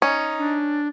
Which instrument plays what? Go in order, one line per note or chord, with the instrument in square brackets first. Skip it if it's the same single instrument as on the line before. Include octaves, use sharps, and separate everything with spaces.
[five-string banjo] C#4 [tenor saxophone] D#4
[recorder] D4